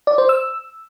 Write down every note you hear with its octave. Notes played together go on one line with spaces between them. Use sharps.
D5
C5
E6